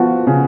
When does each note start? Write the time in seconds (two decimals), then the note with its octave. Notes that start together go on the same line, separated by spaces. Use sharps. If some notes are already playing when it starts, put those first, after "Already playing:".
Already playing: F3 B3 F#4
0.27 C#3